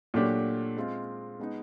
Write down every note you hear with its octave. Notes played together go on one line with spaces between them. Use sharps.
A#2 F#3 A3 D4 G4
G#3 C4 F4
G#3 B3 D#4